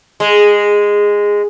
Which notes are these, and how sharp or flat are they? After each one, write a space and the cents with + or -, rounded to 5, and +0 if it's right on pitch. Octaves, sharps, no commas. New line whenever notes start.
G#3 -10